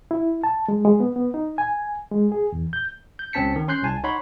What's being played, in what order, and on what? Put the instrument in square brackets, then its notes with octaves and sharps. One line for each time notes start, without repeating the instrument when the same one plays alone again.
[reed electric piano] E4
A5
G#3
G#3
B3
B3
D#4
G#5
G#3
G#4
E2
G6
[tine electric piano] G6
C#2 C4 C#4 A5 B6 C#7
D#3
C#4 C6 F#6 G6 C7
C2 G#5 A5
D#4 C#5 F#5 B5 C6